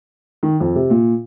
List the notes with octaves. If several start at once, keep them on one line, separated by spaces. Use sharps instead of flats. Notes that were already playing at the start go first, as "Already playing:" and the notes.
D#3
F2
C3
A#2